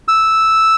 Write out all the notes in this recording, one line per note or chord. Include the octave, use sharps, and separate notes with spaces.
E6